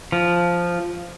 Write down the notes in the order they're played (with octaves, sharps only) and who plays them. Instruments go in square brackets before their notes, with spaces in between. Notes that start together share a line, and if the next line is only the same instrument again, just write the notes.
[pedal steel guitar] F3